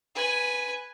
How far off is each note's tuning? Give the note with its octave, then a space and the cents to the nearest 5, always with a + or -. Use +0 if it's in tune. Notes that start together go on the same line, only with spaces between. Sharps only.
B4 +0 G#5 +0